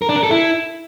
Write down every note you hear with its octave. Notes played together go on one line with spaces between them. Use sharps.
A#4
D4
A#4
A4
E4